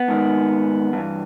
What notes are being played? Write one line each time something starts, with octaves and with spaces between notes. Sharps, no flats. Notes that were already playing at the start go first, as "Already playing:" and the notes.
Already playing: B3
G#2 D#3
G2 E3